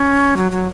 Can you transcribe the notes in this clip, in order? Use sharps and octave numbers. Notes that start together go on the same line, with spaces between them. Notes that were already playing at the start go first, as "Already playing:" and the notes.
Already playing: C#4
F#3
F#3